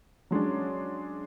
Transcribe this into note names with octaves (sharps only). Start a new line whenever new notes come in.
F#3 G#3 C#4 D4